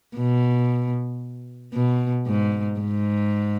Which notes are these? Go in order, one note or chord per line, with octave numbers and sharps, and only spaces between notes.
B2
B2
G#2
G#2